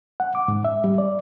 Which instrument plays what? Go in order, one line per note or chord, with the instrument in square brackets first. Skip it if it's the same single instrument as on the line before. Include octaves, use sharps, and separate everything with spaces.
[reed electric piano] F#5
D6
G#2
E5
G3
D5